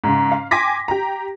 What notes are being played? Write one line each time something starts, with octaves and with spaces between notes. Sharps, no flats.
G#2 C#3
F5
G5 G#5 C6 D6 A#6 B6
G4 A#5